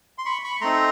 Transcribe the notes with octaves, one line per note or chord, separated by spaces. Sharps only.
C6
B5 C#6
B5 C#6
C#6
A3 C4 D#4 A#5 C6